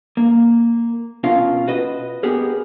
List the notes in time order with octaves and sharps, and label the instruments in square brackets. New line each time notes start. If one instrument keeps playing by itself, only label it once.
[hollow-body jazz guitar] A#3
B2 C#4 F4 A#4 F5
F#4 B4 D#5
B3 G4 G#4 A#4